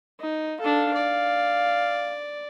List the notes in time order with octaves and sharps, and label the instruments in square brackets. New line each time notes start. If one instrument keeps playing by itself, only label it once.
[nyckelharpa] D#4
[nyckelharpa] D4 A4 [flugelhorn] F5
[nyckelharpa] D5